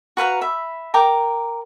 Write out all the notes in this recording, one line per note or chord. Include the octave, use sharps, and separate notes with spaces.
F#4 B4 F5 A#5
E5 B5
A#4 G5 A#5 D6